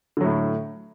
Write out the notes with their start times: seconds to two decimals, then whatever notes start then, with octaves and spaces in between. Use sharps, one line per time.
0.17 D3
0.21 F#3
0.24 A2